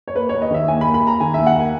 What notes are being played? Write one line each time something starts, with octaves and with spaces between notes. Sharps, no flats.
C#5
A#3 B4
D#2 C#5
D#5
D#3 E5
D#2 G#5
A#3 B5
B5
D#2 A#5
D#3 G#5
D#2 E5
F#5
A#3 G#5